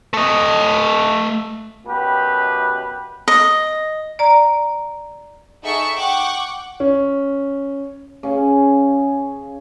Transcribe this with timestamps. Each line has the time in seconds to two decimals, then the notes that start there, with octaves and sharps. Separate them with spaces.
0.13 A3 D#5
1.86 F#2 B2 G4 B4
3.28 D#5
4.19 D5 A#5
5.63 D#4 G#4 A4 E5 F#5 C#6
5.95 F#5 G5 C#6 D6
6.80 C#4
8.23 C#3 C#4 G#4